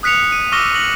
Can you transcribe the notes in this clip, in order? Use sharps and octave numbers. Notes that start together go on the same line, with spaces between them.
D#6 F#6 B6 C#7 F7
D#7
C#6 D6 E6 F6 A#6 G7
A#6 F#7